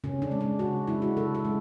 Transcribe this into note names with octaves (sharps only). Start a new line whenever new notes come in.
C#3 C#4
D4
G#3
D4
C#3 F#4
G#3 E4
F#4
C#3 A4
A4
G#3